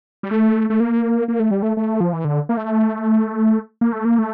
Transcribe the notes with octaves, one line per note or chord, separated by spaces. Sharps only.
G3
A3
A3
A#3
A#3
A3
G3
A3
A3
F3
E3
D3
A#3
A3
A#3
A3
A#3
A3